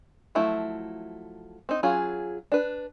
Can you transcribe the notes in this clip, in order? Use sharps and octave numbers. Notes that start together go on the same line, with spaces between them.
F3 F#3 A3 E4
C4 D#4
F#3 C#4 F4 G#4
D4 B4